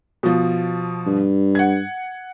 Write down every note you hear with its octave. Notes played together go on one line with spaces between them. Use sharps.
B2 F3
G2
F#5 G#6